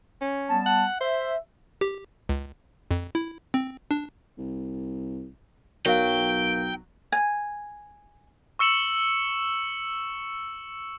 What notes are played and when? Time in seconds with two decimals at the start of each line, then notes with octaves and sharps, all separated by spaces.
0.21 C#4
0.49 G3 B3 A5
0.66 F#5
1.01 C5 E5
1.81 G4
2.29 C#2
2.91 F2
3.15 E4
3.54 C4
3.91 D4
4.38 C2
5.86 B1 F#3 A#4 F5 G5
7.12 G#5
8.59 C#6 E6 C#7 E7 F#7